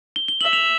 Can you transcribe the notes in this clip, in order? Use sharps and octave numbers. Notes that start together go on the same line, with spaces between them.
G7
G7
E5 F#7
F7